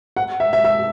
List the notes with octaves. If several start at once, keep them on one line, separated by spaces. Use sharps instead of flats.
F#5
E5
E5
E5